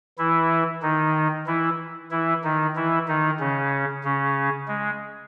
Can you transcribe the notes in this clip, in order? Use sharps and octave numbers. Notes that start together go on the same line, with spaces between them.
E3 E4
D#3 D#4
E3 E4
E3 E4
D#3 D#4
E3 E4
D#3 D#4
C#3 C#4
C#3 C#4
G#3